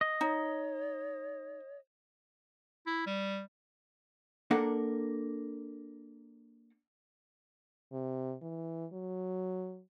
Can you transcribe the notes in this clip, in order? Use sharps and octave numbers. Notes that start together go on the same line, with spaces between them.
D#5
D#4 C#5
E4
G3
A#3 D4 A4 A#4 F#5
C3
E3
F#3